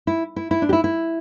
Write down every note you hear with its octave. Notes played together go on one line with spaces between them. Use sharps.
E4
E4
E4
D4
G4
E4
E4